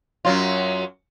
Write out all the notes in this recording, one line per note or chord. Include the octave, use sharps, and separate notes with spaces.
F#2 F#3 F4